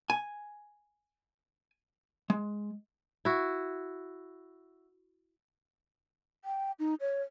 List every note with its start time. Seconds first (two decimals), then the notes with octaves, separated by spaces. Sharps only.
0.10 G#5
2.30 G#3
3.25 E4 F#4
6.45 G5
6.79 D#4
7.01 C#5